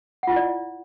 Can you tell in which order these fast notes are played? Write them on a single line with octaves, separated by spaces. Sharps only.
F#5 F4 E4 D5